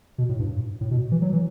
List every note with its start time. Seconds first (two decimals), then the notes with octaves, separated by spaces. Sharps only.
0.18 B2
0.29 A2
0.39 G2
0.81 A2
0.91 B2
1.12 E3
1.22 F#3
1.33 E3